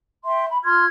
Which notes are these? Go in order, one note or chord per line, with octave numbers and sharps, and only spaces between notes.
E5 G5 C6
B5
F4 C6 F6 G#6